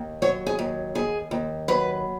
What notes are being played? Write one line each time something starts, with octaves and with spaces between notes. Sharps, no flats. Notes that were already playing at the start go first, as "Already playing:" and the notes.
Already playing: D#2
F#3 C#5
G#4
D#2
D#2 G#4
D#2
F#3 B4